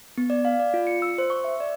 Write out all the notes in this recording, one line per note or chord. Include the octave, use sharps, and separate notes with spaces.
B3
D5
F5
D5
F4
C#7
E6
C5
C#6
E5
D5